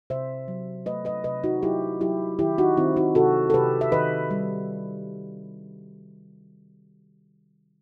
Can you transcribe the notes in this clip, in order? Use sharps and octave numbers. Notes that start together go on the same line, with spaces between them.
C3 C5 E5
F#3
A3 B4 D#5
B4 D#5
C3 B4 D#5
D#4 F#4
F#3 E4 G4
F#3 E4 G4
D#3 E4 G4
D#4 F#4
D#3 C4 E4
D#4 F#4
C3 F#4 A4
A4
C3 G4 B4
E5
D#3 B4 D#5
G3